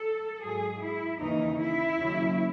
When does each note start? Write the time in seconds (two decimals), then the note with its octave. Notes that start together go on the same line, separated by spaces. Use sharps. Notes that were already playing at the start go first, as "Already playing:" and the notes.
Already playing: A4
0.42 G#2 F#3 G#4
0.82 E4
1.20 D#2 C#3 E3 D#4
1.59 E4
1.98 D#2 C#3 F#3